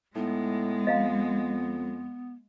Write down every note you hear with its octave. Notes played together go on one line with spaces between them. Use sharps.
A2 G#3 B3 D#4
F2 D#5 F5 A#5